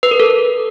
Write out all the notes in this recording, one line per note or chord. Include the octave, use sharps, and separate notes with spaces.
B4
A#4
A4